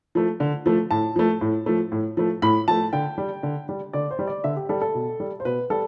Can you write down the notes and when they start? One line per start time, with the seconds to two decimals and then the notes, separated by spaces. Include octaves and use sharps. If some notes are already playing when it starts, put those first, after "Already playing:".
0.15 F3 A3
0.40 D3
0.66 F3 A3
0.91 A2 A5
1.16 F3 A3
1.41 A2
1.66 F3 A3
1.92 A2
2.17 F3 A3
2.42 A2 B5
2.68 F3 A3 A5
2.93 D3 G5
3.18 G3
3.43 D3
3.69 G3
3.93 D3 D5
4.11 C5
4.19 G3
4.27 D5
4.44 D3 E5
4.56 G4
4.69 G3 A4
4.81 A4
4.95 B2
5.20 G3
5.40 C5
5.45 B2 B4
5.70 G3 A4